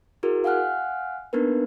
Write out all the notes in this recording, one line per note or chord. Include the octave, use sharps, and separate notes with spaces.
E4 F#4 G#4 A#4
F5 F#5 G#5 F6 F#6
A#3 B3 D4 D#4 A#4 B4